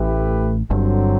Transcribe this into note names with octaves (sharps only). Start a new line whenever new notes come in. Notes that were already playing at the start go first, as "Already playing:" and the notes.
Already playing: A1 A2 A3 E4 G4 B4
G1 G2 D3 F#3 C4